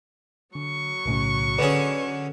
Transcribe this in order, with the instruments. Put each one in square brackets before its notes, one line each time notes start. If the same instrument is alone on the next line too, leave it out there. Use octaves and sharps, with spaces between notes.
[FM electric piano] D3 [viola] F#3 C#6
[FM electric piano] B1 A2 C#3
[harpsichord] D3 C#4 G#4 [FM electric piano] B4 D5